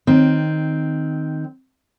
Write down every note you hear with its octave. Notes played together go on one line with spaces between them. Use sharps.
D#3 C4